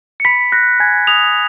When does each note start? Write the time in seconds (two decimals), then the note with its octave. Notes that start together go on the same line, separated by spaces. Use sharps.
0.20 C#7
0.25 B5 B6
0.52 F#6 A#6
0.80 G#5 G#6
1.07 D#6 F7